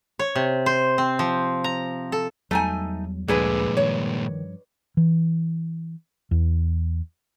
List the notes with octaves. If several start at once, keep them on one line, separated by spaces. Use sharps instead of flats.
C#5
C3
C5
C4
F3
A#5
A4
E2 F#3 G3 A3 D#4 G#5
D2 G2 A#2 D3 F3 G#3 G#4 B4
D#3 C#5
E3
E2